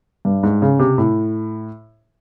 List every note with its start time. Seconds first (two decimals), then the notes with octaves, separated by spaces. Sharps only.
0.25 G2
0.43 G#2
0.62 C#3
0.80 C3
0.98 A2